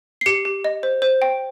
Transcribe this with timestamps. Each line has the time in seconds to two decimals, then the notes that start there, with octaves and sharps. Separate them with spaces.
0.21 C7
0.26 G4 C#7
0.45 G4
0.65 D#5
0.83 C5
1.02 C5
1.22 G5